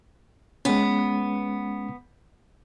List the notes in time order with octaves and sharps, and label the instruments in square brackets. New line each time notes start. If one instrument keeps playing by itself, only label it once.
[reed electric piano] G#3 C#4 [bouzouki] B3